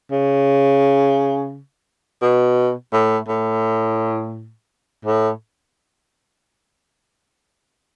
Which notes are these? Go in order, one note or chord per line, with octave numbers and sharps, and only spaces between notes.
C#3
B2
A2
A2
A2